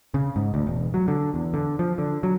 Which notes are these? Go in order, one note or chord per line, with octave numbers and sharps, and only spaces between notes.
C#3
G#2
D2
E1
F#3
D3
E2
D3
F3
D3
F#3